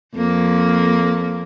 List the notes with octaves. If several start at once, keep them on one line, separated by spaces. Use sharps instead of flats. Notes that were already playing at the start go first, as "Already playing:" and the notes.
F2 A#3